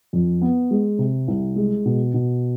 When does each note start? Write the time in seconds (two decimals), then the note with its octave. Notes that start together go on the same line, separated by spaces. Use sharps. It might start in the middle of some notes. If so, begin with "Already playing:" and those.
0.13 F2
0.41 B3
0.71 G#3
0.99 C3
1.28 C2
1.56 G#3
1.85 B2
2.14 B2